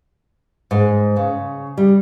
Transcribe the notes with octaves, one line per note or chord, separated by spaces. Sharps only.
G#2
C#3
G3